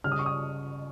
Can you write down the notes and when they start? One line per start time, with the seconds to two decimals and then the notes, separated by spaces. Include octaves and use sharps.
0.04 C#3 G3 F6
0.12 D#6
0.19 C#6
0.26 D#6